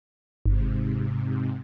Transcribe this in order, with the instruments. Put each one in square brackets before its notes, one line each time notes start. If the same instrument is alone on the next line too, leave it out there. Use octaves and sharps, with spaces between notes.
[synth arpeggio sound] G1 [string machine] G#2 C3